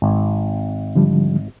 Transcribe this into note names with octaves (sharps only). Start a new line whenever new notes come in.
G#1
D3 F3 G3